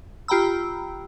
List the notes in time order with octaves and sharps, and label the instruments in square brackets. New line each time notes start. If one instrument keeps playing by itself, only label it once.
[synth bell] F4 G4 G5 A#5 B5 E6